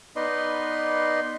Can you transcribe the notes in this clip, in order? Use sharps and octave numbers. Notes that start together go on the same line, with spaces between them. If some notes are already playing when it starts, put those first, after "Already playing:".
B3 D#4 B4 D5 D#5 C6